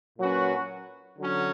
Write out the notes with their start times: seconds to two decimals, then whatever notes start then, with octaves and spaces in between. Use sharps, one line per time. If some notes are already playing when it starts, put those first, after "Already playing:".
0.19 A#2 F#3 C#4 F#4 B4
1.18 D3 F#3 C#4